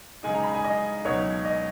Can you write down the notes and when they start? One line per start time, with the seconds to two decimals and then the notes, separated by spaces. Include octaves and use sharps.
0.23 C#3 G#3 D#4 G#5
0.34 A#5
0.44 B5
0.55 G#5
0.64 D#5
1.05 C#2 B2 F#3 B3 D#4 C#5
1.45 D#5